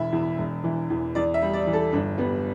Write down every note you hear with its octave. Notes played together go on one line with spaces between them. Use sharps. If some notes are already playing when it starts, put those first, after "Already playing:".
Already playing: E1 E3 E4
E2
E1
E3
E2
E2 D5
E5
G3
D5
E3
A4
G1 D4
G3 B3